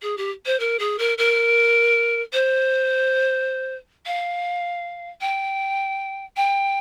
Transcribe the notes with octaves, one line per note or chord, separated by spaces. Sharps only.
G#4
G4
C5
A#4
G#4
A#4
A#4
C5
F5
G5
G5